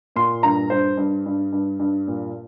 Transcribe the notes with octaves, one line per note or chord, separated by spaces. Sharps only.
A#2 C6
G2 A#5
G2 C5
G2
G2
G2
G2
A#2